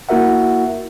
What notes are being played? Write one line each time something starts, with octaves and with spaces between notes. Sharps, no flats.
A#3 E4 F#4 A#4 E5 F#5